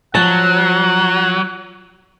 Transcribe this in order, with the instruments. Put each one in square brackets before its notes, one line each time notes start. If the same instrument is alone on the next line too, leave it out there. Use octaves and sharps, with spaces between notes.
[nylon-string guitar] F3 A5 [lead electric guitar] F#3 [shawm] F#5